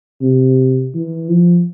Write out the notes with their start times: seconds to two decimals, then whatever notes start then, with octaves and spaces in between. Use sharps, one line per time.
0.22 C3
0.94 E3
1.30 F3